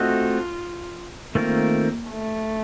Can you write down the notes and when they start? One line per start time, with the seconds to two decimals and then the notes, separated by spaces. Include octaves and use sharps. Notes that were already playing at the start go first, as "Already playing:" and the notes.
Already playing: A3 C4 F4 F#4 A4 D#5
1.35 D#3 A3 A#3 C4 F4 A#4
2.10 A3